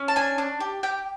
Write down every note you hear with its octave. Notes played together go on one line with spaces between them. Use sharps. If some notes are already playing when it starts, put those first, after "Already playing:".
Already playing: C#4
A5
D4 G#5
D4
G4
G4 G5